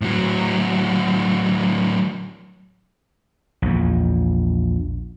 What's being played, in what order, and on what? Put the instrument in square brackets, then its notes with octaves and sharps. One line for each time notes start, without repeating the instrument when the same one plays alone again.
[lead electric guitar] A2 F#3
[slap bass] A#1 E2